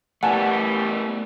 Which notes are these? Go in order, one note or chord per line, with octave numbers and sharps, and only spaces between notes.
E3 G3 A3 B3 F#5 G#5 A5